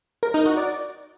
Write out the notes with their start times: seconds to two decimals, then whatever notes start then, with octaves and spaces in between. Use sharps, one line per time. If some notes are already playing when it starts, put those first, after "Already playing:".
0.23 A#4
0.34 D#4
0.46 F#4
0.57 D5